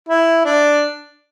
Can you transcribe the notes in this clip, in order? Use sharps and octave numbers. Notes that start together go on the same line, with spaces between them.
E4
D4